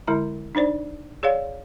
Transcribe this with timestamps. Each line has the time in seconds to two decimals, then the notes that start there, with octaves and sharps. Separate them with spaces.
0.07 D3 G#3 E4 A#5
0.55 D4 D#4 C5 D5
1.23 G#4 C#5 D5 F5